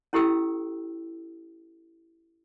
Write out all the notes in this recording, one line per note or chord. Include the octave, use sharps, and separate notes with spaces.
C#4 E4 G4 A4 G5 E6